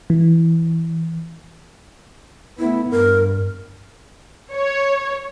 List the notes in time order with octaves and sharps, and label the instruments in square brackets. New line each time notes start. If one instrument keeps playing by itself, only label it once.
[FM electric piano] E3
[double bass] A3 B3 [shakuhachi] E4
[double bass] G2 [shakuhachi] A#4
[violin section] C#5